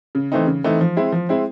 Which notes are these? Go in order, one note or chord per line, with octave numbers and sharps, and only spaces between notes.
C#3
E3 A3 C4 D#4
C#3
E3 A3 C4 D#4
F3
G#3 C4 E4
F3
G#3 C4 E4